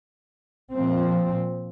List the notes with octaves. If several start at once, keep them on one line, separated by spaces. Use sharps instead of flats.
A#2 F3 C4